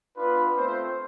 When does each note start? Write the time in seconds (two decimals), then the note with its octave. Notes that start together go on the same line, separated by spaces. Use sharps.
0.16 B3 D4 F4 B4
0.54 A3 C4 F4 C5